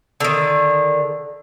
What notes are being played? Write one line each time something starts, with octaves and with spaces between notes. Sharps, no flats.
D3 D#3